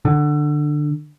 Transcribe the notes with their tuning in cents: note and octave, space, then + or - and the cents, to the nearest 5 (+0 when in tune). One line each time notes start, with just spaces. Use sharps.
D3 +15